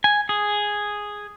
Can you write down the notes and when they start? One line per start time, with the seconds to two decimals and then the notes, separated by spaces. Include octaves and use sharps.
0.04 G#5
0.29 G#4